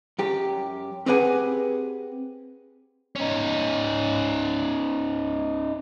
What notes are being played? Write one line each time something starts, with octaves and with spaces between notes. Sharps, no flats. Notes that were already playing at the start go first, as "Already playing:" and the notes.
F#2 G4
C4 G4 G#4 B4 F#5 G#5
C#4 D#4